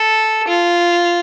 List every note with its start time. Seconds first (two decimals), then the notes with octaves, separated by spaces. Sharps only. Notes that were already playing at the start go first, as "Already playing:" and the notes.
Already playing: A4
0.48 F4